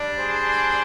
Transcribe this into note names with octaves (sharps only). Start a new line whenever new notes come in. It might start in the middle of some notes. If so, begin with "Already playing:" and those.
Already playing: G3 D4
G#4 C5